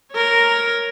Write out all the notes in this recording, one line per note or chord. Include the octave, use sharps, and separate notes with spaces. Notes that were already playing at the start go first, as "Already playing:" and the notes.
A#4 C#5